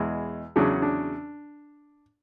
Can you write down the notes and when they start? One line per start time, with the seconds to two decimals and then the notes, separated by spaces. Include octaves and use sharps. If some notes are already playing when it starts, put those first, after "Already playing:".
Already playing: E2 B2 G#3
0.56 E2 C#3 F#3 C#4 D4
0.82 D4